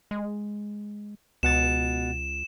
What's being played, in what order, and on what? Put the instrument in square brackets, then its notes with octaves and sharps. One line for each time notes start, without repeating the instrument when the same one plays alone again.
[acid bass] G#3
[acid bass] C#2 [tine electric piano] B2 F#5 A6 [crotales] E7